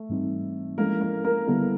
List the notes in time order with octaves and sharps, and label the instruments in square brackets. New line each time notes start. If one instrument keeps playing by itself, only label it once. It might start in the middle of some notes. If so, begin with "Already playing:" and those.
Already playing: [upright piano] A3
[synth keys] G#2 E3 G3 C4 D#4
[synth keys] F3 G#3 C#4 E4 A4 [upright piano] A#3 A#4
[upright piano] A#3 A#4
A#3 A#4
[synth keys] D3 G3 B3 E4 A4